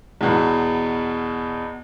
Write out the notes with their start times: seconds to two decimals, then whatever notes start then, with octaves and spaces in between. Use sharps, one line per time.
0.21 E2 B2